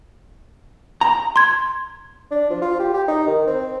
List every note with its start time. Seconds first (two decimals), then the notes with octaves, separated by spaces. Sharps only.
1.01 A#5
1.36 C6 G#6
2.31 D4
2.50 F3
2.62 F4
2.80 G4
2.93 G4
3.08 D#4
3.27 D#3
3.47 C4